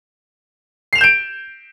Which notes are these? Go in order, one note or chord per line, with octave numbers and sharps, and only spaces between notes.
G6 C7 D7 E7 F7